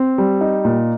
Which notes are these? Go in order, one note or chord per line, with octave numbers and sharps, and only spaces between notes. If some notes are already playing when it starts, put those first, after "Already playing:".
Already playing: C4
G3
D#4
A#2